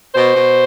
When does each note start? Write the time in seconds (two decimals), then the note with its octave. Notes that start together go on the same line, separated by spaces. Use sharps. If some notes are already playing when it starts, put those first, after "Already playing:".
0.14 B2 C5
0.36 B2